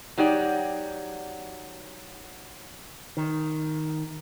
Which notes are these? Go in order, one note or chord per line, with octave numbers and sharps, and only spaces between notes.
F#3 D#4 G4 D5
D#3